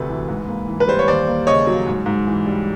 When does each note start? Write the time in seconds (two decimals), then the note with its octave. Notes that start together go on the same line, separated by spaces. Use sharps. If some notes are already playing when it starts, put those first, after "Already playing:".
Already playing: D2 C3 F#3 A3 B4
0.09 E3
0.28 G#2
0.48 A#3
0.68 E3
0.80 B4
0.88 G3 C5
0.99 C#5
1.07 D#2 C5 D5
1.27 A#3
1.47 C#3 C#5 D#5
1.67 F#3
1.87 G#2
2.06 G#2
2.27 E3
2.46 G3